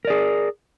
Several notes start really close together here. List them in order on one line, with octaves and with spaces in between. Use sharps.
A#4 D5 G#4